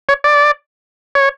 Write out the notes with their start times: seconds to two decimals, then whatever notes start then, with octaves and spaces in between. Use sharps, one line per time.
0.09 C#5
0.24 D5
1.15 C#5